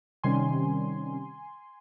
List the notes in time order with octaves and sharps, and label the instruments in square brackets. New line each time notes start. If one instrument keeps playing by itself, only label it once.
[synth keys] C3 D#3 G3 C#4 G#5 C6